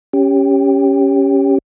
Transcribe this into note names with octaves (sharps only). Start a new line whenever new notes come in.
C#4 G4